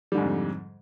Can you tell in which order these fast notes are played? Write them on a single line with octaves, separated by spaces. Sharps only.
G3 D3 G#2 F2